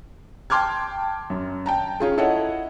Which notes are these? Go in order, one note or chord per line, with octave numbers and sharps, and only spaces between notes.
G5 A5 C6 D6 F6 G#6
F#2
G5 A5 A#5
C#4 F4 G#4
E4 A4 C#5 D#5 F#5